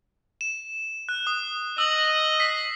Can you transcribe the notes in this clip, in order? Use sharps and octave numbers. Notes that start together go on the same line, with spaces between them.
E7
F#6
D#6
D#5 E6 F#7
B6 C7